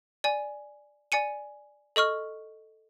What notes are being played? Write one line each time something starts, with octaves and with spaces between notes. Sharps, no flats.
D5 G#5
D5 G#5 C#7 D#7
A4 D#5 C#6 F6